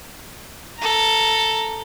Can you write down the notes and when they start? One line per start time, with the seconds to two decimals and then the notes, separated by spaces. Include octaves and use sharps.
0.80 A4 A#5